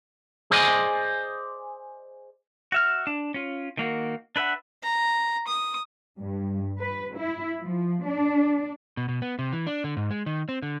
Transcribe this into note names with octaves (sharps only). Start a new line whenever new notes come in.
G#4 C5 D5 D#5 G#5
F#4 E5 F6
D4
C#4 F4
D#3 A#3 F#4
D4 B4 E5 F#5
A#5
D#6
G2
B4
E4
F3
D4
B2
B2
B3
C3
E3
D4
D3
G#2
G#3
D#3
C4
D3